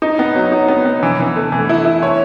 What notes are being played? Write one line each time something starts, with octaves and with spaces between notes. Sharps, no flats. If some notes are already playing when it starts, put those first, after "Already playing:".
D#4
B3
F#3
D#4
B3
B3
E3
E3
A3
E3
E4
E4
C#5